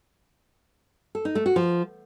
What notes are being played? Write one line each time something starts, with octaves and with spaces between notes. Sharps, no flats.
A4
D#4
A3
F#4
F3